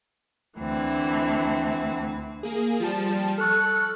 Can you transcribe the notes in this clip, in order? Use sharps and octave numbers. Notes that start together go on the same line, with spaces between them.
D2 E3 C4
A#3 G#4
F3 G3 A5
A4 C#6 F6 F#6